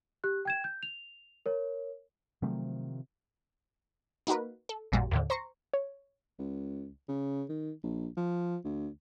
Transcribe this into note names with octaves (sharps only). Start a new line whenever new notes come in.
G4 F#6
G5 G#6 E7
G6
F7
A#4 C#5
C3 D#3 F3 F#3 A3
A#3 D#4 F#4 A#4 B4
A4
A1 F2 A#2 G3 F#4
D#2 A2 D3
C5 A#5 C6 C#6
C#5
C#2
C#3
D#3
A#1
F3
D2